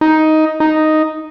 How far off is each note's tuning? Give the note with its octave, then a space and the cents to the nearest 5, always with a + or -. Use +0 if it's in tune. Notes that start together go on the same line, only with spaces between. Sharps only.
D#4 +10
D#4 +0